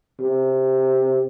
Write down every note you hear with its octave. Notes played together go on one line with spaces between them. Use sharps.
C3